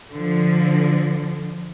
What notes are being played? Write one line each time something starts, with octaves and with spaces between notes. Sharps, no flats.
D3 F3